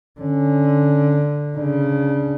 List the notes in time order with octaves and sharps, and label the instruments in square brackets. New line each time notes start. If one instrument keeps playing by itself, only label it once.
[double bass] D3 [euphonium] C#4
[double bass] C#3 [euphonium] D4